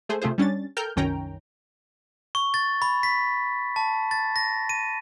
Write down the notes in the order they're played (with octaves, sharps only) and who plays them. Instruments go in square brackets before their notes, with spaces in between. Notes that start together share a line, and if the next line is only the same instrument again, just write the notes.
[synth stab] A3 G#4 C5
C3 A3 F4 G#4 C5
G3 C#4 D4 A6
A4 A#4 G5 F6 G6
C2 F#2 D#3 C#4 G5 A#5
[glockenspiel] C#6
A6
B5
B6
A5
A6
A#6
D#7